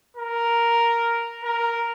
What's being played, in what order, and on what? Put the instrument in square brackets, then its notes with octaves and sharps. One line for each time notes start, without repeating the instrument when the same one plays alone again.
[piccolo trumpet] A#4
A#4